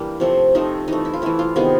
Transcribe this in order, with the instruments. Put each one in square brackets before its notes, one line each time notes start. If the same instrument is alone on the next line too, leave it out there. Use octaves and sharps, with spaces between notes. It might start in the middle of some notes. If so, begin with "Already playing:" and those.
Already playing: [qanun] E3 G3 A#3 D4
C3 F3 A3
C3 F3 A3 D#4
E3 A3 D#4
E4
F4
E3 A3 E4
F4
C3 D#3 G#3 B3 F4